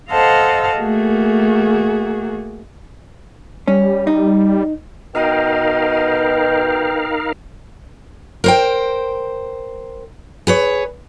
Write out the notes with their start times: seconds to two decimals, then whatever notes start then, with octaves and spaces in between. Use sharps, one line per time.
0.11 A4 C5 D#5 F5 F#5 A5
0.79 A3 A#3 F#4 G#4
3.68 G3 C#4
4.07 D#4
5.15 B2 D#4 A#4 D#5 F5 G5
8.44 A#4 C5 G5
10.47 G#4 B4 C#5